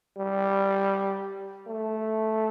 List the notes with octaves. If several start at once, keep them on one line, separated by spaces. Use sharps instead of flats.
G3
A3